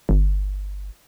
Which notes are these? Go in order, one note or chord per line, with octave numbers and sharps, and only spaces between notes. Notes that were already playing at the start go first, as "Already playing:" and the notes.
G1